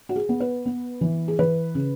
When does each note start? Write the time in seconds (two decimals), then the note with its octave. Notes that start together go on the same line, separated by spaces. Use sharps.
0.09 F#4
0.16 G#4
0.29 B3
0.40 B4
0.66 B3
1.01 E3
1.28 G#4
1.39 E3 B4
1.75 C#3